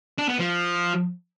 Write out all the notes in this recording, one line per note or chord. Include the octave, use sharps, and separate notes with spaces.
D4
B3
F3